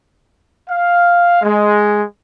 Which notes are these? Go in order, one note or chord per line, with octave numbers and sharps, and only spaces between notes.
F5
G#3